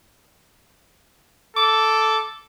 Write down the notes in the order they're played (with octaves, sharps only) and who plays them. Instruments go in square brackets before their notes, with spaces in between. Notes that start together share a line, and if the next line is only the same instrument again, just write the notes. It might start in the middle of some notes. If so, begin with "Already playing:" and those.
[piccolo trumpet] A4 [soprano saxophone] D6